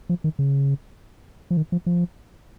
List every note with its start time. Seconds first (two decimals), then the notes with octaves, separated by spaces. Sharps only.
0.09 F3
0.24 D#3
0.39 C#3
1.51 F3
1.57 D#3
1.72 F3
1.86 F3